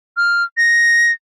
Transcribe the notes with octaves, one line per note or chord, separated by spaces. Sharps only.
F6
A#6